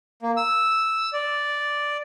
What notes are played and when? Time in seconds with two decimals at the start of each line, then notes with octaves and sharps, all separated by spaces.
0.22 A#3
0.37 E6
1.13 D5